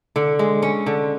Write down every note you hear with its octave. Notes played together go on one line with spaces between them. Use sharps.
D3
G#3
C#4
D3